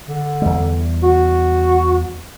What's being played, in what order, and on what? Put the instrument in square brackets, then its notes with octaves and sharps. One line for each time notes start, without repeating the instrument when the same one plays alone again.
[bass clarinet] D3
[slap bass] E2 G3
[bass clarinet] F#4